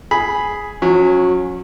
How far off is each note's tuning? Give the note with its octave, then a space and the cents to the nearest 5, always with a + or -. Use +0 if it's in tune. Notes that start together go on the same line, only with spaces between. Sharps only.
G#4 +0 B5 +0
F#3 -30 C#4 +0